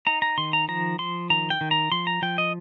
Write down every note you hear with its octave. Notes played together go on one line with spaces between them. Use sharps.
D#4 A#5
A#5
D#3 C6
A#5
F3 A#5
F3 C6
D#3 A#5
G5
D#3
A#5
F3 C6
A#5
F3 G5
D#5